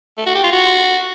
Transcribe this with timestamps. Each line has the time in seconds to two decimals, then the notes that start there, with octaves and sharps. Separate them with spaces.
0.18 A3
0.27 F#4
0.35 G4
0.44 F4
0.52 F#4